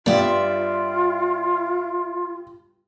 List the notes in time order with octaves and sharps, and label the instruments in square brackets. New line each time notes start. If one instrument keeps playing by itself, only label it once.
[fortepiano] G2 G3 B3 [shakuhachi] F4 [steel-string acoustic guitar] D5 E5